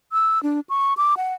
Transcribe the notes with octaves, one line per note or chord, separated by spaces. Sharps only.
E6
D4
C#6
D6
F#5